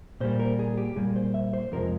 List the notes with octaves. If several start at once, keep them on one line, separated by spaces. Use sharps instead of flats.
A#2 G3 A#3 C5
A#4
G#4
G4
A#2 G3 A#3 G#4
C5
E5
C5
F2 C3 F3 G#3 A#4